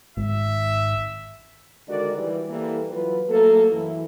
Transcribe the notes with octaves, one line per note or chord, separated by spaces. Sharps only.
G#1 E5
D3 D#3 G#3 F#4 A#4 D5
E3 G3
E3 G3 A#3 A4
E3 F#3 F4 B4
F#3 A3 A#3 A4
F#2 E3 E4